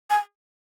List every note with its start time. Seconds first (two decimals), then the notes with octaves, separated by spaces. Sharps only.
0.10 G#5